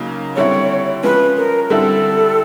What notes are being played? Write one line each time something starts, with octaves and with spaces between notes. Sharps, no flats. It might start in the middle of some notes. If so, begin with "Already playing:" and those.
Already playing: C#3 F#3 A#3 D#4
D3 G3 C4 E4 C#5
F3 G#3 C#4 B4
A#4
D3 G3 C4 E4 A4